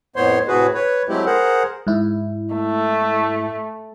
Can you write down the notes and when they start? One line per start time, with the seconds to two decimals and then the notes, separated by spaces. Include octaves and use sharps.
0.16 F2 A2 B3 C5 C#5 C6
0.48 A2 C3 F#4 G#4 B4
0.74 B4 C#5
1.09 F#3 G#3 A3 C4 E4 G4
1.26 G#4 A#4 C5 F#5
1.87 G#2 E4
2.55 A3